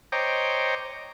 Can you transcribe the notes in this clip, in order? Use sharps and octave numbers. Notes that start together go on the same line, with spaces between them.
C5 C#5 D#5 G5 A#5 D6